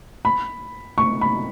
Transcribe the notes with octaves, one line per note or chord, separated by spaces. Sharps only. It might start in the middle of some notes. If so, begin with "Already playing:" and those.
B5
C#6
B5